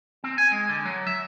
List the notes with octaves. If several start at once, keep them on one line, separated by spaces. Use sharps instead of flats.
C4
G#5
G#3
D3
F#3
E5